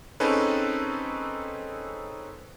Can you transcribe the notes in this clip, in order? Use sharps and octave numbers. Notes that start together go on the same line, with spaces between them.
C4 C#4 D#4 G#4 A4 B4